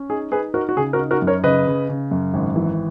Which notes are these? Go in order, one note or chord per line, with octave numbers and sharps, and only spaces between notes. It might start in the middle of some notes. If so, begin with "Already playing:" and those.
Already playing: C#4
D#4 G#4
D#4 G#4 B4
D#4 F#4 A#4
F#4
C#3 G#4
F#4 A#4
D#4
F#4 A#4
F#2
A#4 C#5
C#3 B4 D#5
C#3
C#3
F#2
G#1
E3